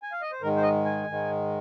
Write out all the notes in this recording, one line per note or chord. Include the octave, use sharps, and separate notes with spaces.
G#5
F5
D#5
C5
G#2 D#3 G#3 A#4
C5
D#5
G#5
G#2 D#3 G#3